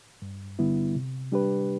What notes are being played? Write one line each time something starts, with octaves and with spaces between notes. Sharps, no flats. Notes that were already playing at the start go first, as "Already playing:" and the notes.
G2
D3 G3 B3 E4
C3
G3 D4 G4 B4